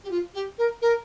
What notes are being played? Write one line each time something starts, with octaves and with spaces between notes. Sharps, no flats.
G4
F4
G4
A#4
A#4